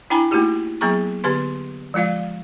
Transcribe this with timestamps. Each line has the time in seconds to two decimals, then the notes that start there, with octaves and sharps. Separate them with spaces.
0.10 D4 E4 G5 G#5 A#5 B5
0.31 A3 A#3 D#4 E4 F#4 G4
0.81 F#3 A#3 B3 G#4 A#5 C#6
1.24 D3 B3 G4 B4 C6
1.94 F3 G#3 F4 D5 F5